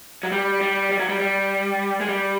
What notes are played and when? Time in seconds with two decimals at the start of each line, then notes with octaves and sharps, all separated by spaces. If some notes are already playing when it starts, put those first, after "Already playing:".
0.23 F#3
0.32 G3
0.61 G3
0.91 G3
1.00 F#3
1.09 G3
1.20 G3
2.00 G#3
2.09 G3